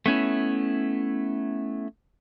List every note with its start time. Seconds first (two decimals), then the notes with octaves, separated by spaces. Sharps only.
0.06 A3 B3 C#4 E4